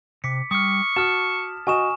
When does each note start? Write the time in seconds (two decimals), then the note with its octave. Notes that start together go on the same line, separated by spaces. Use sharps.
0.24 C3 D6 B6 C#7
0.51 G3 C#6 D#6 F6
0.96 F#4 A5 D#6 F6 E7
1.67 F#4 D#5 G#5 C#6 D#6 E7